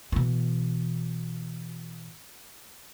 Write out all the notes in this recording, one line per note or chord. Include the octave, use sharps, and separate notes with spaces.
B2 E3